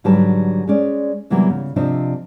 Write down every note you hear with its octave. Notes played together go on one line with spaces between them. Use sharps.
G#2 D3 F#3 G3 B4 A5
G#3 C#4 D5
C3 E3 F#3 G3 A#3 B3
C#3
C3 F3 C4 D4 C5 D#5